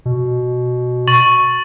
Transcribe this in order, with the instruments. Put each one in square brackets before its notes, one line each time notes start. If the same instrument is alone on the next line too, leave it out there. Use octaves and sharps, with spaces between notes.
[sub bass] B2
[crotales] C#6 A6 F#7